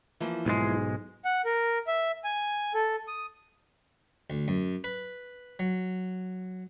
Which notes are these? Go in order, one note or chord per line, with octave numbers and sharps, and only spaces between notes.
E3 F3 A#3
B1 G#2 G#3
F#5
A#4
E5
G#5
A4
D#6
D2
F#2
B4
F#3